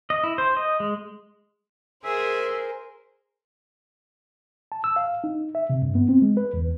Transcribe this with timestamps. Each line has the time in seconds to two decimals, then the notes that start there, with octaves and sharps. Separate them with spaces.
0.10 D#5
0.24 E4
0.38 C5
0.57 D#5
0.80 G#3
2.04 G#4 A#4 C5 E5
4.72 A5
4.84 E6
4.96 F5
5.24 D#4
5.55 E5
5.70 C3
5.82 G2
5.95 B3
6.09 C4
6.22 G#3
6.37 B4
6.54 E2